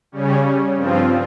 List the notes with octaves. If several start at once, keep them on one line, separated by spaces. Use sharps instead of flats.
C#3 G3 C#4
G2 F3 C4 F4